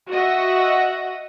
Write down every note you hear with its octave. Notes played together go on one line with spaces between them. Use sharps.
F#4 D#5 E5 F#5